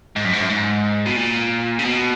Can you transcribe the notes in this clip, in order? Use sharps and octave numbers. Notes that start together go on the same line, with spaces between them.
G#2
F#2
G#2
F#2
G#2
B2
A#2
C#3
B2